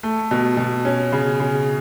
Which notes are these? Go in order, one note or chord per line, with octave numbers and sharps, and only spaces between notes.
A3
B2
B2
C#4
C#3
C#3